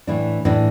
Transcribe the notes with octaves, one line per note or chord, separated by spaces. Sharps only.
A2 E3 A3 D4
A2 E3 A3 D4